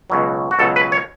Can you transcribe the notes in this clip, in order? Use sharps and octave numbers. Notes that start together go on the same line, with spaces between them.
C#2 B2 F#3
F#4
C#2 B2 F#3 A4
B4
C#5